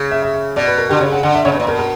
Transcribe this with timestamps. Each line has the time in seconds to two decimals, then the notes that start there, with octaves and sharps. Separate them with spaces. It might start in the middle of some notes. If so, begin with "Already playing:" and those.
Already playing: C#3
0.11 E5
0.23 E5
0.34 E5
0.56 B2 D5
0.67 B4
0.78 A#4
0.89 D3 G4
1.01 C#3 C#5
1.12 F#5
1.23 D3 F#5
1.35 E5
1.45 C#3 C#5
1.52 B2
1.56 A#2 B4
1.67 B2 A#4
1.79 A#4